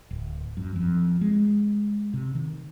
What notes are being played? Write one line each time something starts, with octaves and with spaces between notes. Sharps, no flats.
D1
F#2
F2
G#3
C3
D#3